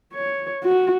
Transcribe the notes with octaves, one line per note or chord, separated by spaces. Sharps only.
C#5
F#4